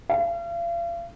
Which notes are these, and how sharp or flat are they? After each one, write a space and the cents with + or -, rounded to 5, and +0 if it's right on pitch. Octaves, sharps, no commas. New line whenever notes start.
F5 -40